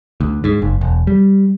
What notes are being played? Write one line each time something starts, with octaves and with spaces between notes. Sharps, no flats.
D2
G#2
F#1
E1
G3